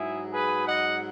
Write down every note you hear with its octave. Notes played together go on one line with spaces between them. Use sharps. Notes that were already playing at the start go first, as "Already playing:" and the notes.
Already playing: G#2 F#3 E4 G#4
G#4 B4
D#5 F#5